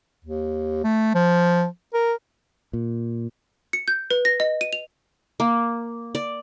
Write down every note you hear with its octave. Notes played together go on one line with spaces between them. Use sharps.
D#2
A3
F3
A#4
A#2
C#7
G6
B4
A#6
D#5
D#7
F7
A#3
D5